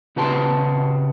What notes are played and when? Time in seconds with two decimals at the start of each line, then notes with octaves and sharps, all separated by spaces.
0.16 C#3 F#4 G4 B4 A5 C6